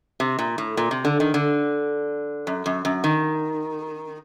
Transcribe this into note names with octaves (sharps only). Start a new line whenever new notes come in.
C3
A#2
A2
A#2
C3
D3
D#3
D3
F#2
F#2
F#2
D#3